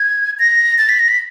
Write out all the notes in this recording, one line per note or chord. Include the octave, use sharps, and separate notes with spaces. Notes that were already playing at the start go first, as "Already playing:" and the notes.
Already playing: G#6
A#6
A6
B6
A#6
B6